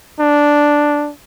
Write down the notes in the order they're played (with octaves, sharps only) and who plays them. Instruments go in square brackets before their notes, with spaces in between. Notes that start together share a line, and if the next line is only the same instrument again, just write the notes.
[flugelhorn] D4